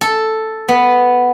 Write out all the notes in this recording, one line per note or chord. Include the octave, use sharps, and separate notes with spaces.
A4
B3